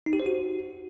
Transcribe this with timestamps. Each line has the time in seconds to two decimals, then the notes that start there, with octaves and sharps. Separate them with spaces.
0.06 D#4
0.13 G4
0.20 C5
0.26 F#4